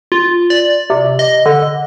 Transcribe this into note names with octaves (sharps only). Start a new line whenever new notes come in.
F4
D5
C3
D#5
D3